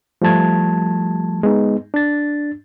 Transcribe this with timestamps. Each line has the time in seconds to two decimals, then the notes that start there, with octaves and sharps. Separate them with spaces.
0.22 F3 G3 A3 A5 G#6
1.43 G#3 B3 D#4
1.94 D4 A6